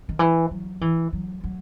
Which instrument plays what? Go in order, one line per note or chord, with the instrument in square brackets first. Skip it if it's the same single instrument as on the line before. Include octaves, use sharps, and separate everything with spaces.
[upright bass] D#3
E3
F#3
E3
F#3
F#3